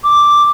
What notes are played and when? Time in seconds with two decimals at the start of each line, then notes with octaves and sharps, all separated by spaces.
0.04 D6